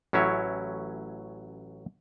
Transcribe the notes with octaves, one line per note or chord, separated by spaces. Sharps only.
A1 F#3 C#4 E4 C#5